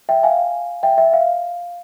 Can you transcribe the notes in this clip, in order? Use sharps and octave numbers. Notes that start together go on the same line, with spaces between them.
E5 G5
F5 G#5
E5 G5
E5
F5